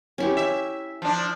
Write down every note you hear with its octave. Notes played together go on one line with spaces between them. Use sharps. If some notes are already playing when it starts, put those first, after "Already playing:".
C#4 E4 G4
E5
F3 D4